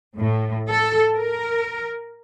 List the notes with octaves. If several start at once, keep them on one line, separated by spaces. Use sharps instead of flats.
A2
A4
A#4